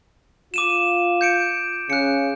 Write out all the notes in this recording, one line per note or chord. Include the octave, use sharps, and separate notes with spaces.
F4 D6 D#7 E7
G6 C#7 D7
C#3 F#6 C#7